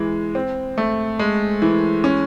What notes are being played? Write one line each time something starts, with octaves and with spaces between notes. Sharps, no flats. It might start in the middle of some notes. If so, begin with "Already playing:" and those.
Already playing: E3 G#3
C4
A3
G#3
E3
C#4